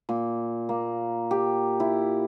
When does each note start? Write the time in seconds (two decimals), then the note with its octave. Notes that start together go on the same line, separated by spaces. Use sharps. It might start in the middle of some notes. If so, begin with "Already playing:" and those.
0.09 A#2
0.69 A#3
1.31 G4
1.80 E4